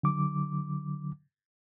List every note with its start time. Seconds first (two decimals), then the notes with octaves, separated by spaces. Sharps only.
0.03 D3 F#3 D6